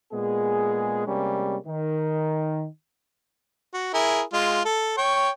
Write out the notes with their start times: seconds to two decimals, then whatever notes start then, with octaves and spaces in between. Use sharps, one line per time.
0.12 A#2 G#3 B3 G#4
1.07 C3 G3 G#3 A#3 C#4
1.67 D#3
3.74 F#4
3.94 E4 G#4 A#4
4.33 G#3 F4
4.65 A4
4.97 C#5 G5 C#6